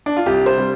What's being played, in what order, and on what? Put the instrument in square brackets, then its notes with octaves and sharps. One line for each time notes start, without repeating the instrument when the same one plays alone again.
[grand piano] D4
F4
C2 G4
C5
C3 G3